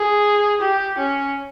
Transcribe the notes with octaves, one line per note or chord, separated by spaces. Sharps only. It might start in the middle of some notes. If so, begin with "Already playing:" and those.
Already playing: G#4
G4
C#4